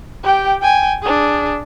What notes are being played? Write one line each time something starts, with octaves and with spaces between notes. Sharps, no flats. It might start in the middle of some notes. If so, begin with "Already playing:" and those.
G4 G5
G5 G#5
D4 G#4